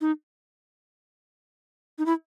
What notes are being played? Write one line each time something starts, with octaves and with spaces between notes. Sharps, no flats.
D#4
D#4
E4